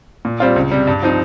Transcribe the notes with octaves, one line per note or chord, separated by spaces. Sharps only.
A#2
G3 C4 F4
C#2
C3 G3
G2
F3 C4 D#4